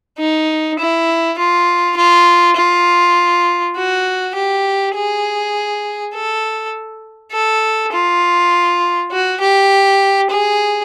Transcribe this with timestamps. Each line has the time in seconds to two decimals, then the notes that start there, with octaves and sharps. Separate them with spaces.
0.19 D#4
0.79 E4
1.38 F4
1.97 F4
2.56 F4
3.76 F#4
4.35 G4
4.95 G#4
6.14 A4
7.32 A4
7.92 F4
9.11 F#4
9.40 G4
10.30 G#4